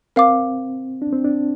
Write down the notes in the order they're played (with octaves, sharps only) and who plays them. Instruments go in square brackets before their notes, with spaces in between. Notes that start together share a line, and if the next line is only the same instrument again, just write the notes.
[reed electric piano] C4 [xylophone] A#4 F5 D6
[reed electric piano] D4
C4
D4